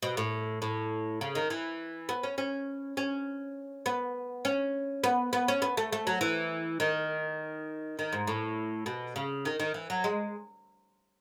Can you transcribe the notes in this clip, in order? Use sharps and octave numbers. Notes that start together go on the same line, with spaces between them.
B2
A2
A2
C#3
D#3
E3
B3
C#4
C#4
C#4
B3
C#4
B3
B3
C#4
B3
A3
A3
F#3
E3
D#3
D#3
G#2
A2
B2
C#3
D#3
D#3
E3
F#3
G#3